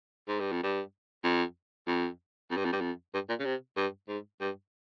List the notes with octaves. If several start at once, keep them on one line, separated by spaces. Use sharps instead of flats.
G#2
G2
F2
G2
F2
F2
F2
G2
F2
G2
F2
G2
A#2
C#3
C3
G2
G#2
G2